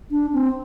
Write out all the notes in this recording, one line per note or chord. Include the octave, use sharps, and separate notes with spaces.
D4
C4